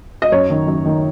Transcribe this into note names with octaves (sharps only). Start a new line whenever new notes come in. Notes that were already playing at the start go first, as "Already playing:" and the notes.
D#5
F#2 C#5
D#3
F#2
D#3